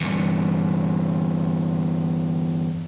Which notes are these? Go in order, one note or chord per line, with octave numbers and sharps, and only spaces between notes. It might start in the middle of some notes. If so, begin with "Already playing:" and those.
E2 G2